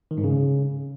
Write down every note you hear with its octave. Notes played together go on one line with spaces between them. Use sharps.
D#3
G#2
C#3